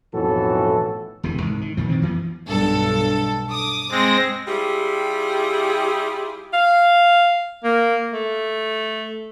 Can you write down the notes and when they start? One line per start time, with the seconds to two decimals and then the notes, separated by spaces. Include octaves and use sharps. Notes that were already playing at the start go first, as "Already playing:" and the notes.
0.14 B1 F2 A2 E3 F#4 A4
1.23 E1 C3 E3
1.39 C2 G#2
1.61 D#3
1.77 G2 A#2 D#3 F3
1.88 D#3 E3 C4
2.02 F#2 E3 F3 B3
2.48 B1 G2 A4
3.49 D6 D#6
3.91 G#3 C4 A#6
4.47 G3 E4 F4 G4 G#4
6.53 F5
7.64 A#3
8.13 A3